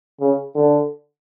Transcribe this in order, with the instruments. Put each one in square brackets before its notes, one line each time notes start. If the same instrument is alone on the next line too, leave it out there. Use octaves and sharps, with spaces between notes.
[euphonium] C#3
D3